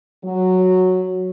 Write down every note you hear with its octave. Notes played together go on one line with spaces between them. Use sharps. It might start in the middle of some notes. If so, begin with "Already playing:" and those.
F#3